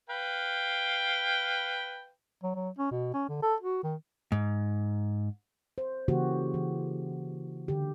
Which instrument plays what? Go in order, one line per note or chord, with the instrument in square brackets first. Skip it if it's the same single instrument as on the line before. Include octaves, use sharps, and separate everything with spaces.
[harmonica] B4 F5 G5
[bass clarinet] F#3
F#3
C#4
B2
C#4
D3
A4
F#4
D#3
[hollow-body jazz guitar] G#2
[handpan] C5
C#3 E3 A#3 F#4 G4 C5
E3
D3 G4